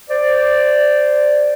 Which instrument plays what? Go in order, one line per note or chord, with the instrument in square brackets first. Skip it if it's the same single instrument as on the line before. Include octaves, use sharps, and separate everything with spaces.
[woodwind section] C5 D5